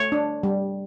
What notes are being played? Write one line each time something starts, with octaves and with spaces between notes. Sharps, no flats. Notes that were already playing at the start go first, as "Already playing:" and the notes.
Already playing: A3 C#5
D4
G3